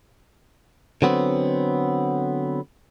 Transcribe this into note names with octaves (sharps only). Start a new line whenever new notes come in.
D3 F#3 B3 C4